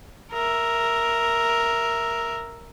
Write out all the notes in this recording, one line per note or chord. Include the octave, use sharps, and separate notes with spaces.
A#4 E5